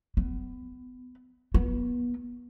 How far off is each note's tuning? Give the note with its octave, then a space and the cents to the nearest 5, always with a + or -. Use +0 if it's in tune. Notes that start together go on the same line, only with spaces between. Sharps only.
B3 +25
B3 -25